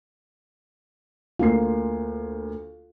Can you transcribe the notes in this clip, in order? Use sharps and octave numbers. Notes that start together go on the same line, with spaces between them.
D2 A#3 F4 C7